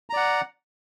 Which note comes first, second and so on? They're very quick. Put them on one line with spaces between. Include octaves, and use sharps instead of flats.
A#5 D5 F#5